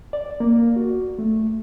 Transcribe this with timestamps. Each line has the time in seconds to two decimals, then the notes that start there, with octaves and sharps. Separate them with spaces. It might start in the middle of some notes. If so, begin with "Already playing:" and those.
0.13 D5
0.40 A#3
0.76 F#4
1.19 A3